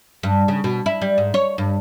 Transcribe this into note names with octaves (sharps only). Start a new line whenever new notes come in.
G2
C#3
B2
E4
G3
G#2
C#5
G2